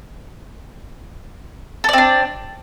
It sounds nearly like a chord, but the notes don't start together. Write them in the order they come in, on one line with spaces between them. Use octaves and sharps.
A4 D5 C4 D4